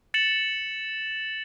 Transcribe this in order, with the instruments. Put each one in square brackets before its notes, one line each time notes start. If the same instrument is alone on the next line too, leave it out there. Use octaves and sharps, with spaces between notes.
[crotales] A6 C#7 E7 F#7